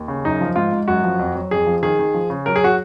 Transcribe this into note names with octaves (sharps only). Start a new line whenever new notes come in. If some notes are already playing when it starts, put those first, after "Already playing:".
Already playing: D#2
C#3
F#2 D#4
F3
G#2 F4
G#2
F#2 F#4
F3
F2
F#3
F2 G#4
F3
D#3 G#4
D#3
F3
C#3
F#3 A#4
G#4
F#4